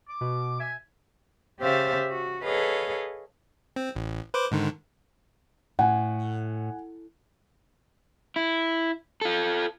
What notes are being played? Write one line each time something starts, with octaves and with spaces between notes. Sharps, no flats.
D6
B2
E5 G#5
C#3 G4 C5 E5 F5 A6
F#4
G#4 A4 B4 C#5 D#5 F5
C4
A1
B4 C5 D6
G#2 D3 D#3
A2 F#5 G#5
E4
F4 A4